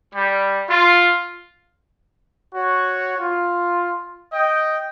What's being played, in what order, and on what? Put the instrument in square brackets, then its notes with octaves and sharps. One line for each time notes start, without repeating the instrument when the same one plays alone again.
[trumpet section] G3
F4
F#4 C#5
F4
D#5 G5